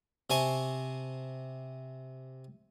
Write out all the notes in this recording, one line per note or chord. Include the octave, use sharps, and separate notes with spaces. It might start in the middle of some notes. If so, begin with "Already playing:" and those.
C3 C5 G#5 A5 C#6